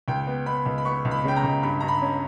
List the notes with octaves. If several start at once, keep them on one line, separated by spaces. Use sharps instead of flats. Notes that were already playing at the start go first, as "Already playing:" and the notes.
C#2 G5
B3
B3 B5
C#2
B5
B3 C#6
C#2
B5
C#3 G5
A#5
C#2
G2 B5
G2 A#5
B5
C#4